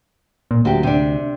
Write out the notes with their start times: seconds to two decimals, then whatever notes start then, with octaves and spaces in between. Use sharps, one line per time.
0.51 A#2
0.65 D2 F#3 F#4 G4
0.83 C3 D4